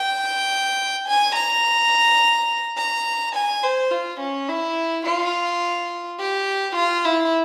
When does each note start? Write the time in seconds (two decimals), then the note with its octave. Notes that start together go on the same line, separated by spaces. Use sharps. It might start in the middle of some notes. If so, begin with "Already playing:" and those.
Already playing: G5
1.08 G#5
1.35 A#5
2.77 A#5
3.35 G#5
3.63 C5
3.91 F4
4.20 C#4
4.48 E4
5.05 F4
6.19 G4
6.76 F4
7.05 E4